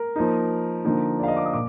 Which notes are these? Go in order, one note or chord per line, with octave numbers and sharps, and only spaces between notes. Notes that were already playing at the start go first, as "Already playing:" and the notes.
Already playing: A#4
F3 A#3 D#4
D3 F3 A#3 D#4
D5
F5
D#5
D6
D#6
A#2 D6